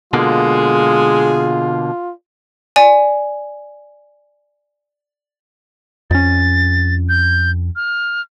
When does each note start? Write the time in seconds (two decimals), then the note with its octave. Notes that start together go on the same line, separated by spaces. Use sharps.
0.13 B2 D3 G#3 A#3 F4 G#4
2.76 D5 G#5
6.11 F2 C#4 A6
7.09 G6
7.76 F6